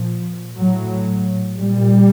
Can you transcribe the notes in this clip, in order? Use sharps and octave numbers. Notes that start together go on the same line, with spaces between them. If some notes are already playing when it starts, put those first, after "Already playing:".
Already playing: A#2 F3
A2 F#3
A#2 G3